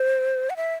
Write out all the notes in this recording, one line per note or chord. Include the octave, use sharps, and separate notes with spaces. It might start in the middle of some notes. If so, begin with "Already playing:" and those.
Already playing: C5
F#5
E5